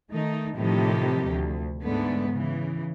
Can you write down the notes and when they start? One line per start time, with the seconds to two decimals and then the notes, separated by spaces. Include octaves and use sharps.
0.12 D#3 A3 D#4
0.57 A2 C3 D#3 F3 D#4 G4
1.31 D2
1.84 G#2 D3 A3 B3
2.32 C#3 E3